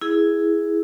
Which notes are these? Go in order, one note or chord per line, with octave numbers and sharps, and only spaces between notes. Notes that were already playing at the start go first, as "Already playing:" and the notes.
E4 G#4